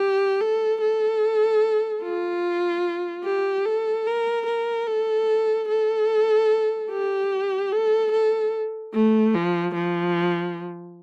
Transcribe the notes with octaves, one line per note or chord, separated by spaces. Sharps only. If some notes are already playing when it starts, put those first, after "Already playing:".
Already playing: G4
A4
A4
F4
G4
A4
A#4
A#4
A4
A4
G4
A4
A4
A3
F3
F3